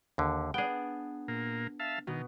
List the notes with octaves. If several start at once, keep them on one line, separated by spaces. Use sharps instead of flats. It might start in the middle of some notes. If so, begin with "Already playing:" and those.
D#2 D3
B3 D4 G#4 G5
A#2 A#3
E5 F5 A5
B2 D#3